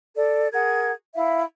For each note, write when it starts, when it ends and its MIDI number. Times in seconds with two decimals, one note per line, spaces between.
0.17 0.47 69
0.17 0.47 74
0.53 0.91 68
0.53 0.91 70
0.53 0.91 78
0.53 0.91 92
1.15 1.42 64
1.15 1.42 76
1.15 1.42 77